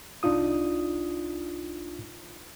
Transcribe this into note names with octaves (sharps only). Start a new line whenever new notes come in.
C2 D4 D#4 F4 D#6